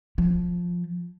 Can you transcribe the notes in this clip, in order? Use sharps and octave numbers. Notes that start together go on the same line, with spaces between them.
F3